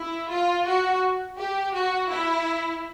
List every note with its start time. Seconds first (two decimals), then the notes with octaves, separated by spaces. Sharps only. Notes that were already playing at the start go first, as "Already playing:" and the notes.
Already playing: E4
0.29 F4
0.65 F#4
1.37 G4
1.73 F#4
2.08 E4